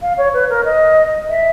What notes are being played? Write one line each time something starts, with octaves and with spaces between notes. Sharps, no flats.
F5
C#5
B4
A#4
D#5
E5